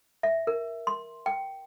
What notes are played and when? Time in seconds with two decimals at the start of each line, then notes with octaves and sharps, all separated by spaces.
0.23 E5
0.47 A#4
0.87 C6
1.26 G5